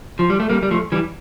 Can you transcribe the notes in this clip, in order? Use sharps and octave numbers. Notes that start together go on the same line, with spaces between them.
F3
G3
A3
G3 A#3
G3
F3 A3
E3 G3